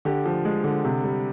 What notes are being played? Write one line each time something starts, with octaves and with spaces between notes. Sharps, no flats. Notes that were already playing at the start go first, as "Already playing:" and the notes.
D3 G4
F3
G#3
D3
C3
G3